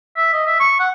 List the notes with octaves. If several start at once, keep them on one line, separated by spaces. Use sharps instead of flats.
E5
D#5
E5
C#6
F#5